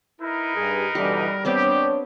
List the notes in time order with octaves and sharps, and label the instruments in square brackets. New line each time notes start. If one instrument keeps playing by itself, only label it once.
[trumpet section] D#4 A#4 B4 [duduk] E4
[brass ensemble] G2 [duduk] G#4
[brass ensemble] B2 D3 E3 [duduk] G3 [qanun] G4
[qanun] B3 C4 C5 [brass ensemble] D4 C#5 [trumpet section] G4